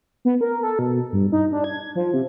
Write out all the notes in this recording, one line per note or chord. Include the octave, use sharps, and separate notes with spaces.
B3
A#4
A4
B2
G2
D#4
D4
G#6
F3
C3